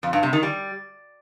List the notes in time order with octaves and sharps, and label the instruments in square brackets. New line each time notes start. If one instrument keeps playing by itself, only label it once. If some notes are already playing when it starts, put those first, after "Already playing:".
[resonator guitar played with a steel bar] F2
G2
C3
D#3
G3